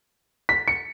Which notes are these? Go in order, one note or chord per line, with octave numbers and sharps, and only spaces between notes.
B6
C#7